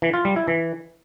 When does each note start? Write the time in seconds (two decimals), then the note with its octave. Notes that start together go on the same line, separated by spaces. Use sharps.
0.02 E3
0.14 F4
0.25 G3
0.36 E4
0.48 E3